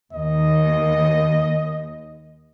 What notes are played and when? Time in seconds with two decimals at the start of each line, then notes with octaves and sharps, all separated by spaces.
0.13 D#2 D#5